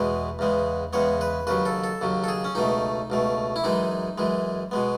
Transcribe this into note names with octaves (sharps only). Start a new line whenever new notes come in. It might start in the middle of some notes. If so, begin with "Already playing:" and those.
Already playing: E2 B2 G#3 B3 B4
E2 C#3 G#3 B3
E2 C#3 G#3 B3 C#5
B4
D#2 C#3 F#3 B4
A4
A4
D#2 C#3 F#3
A4
G#4
C#4
C#2 B2 A3 D#4
C#2 B2 A3
E4
F#2 E3 G#3 D#4
F#2 E3 G#3
B2 G#3 B3